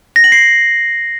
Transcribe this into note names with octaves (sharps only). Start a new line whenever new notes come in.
A#6
F#7
C7